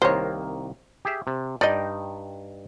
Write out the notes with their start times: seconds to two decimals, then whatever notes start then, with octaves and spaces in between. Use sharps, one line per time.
0.02 C2 D#3 A#3 C5 C#5
1.05 G4 G#4 E5
1.27 C3
1.61 G2 D#4 D5 D#5 G5